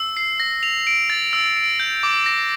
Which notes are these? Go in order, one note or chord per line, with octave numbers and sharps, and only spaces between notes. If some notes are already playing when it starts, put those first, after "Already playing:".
Already playing: E6
C7
A#6
F7
D7
A6
E6
D7
G6
D6
A#6